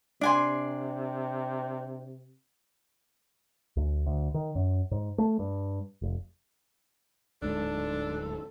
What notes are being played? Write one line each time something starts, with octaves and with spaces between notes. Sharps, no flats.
C3 D4 D5 G#5 C6
D2
D2
D#3
F#2
G#2
A3
G2
F1
D1 G#2 D4 A4